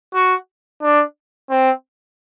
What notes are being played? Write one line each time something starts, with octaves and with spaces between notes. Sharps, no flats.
F#4
D4
C4